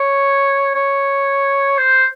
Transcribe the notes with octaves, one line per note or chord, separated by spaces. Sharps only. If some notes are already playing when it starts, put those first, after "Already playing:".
Already playing: C#5
C#5
C5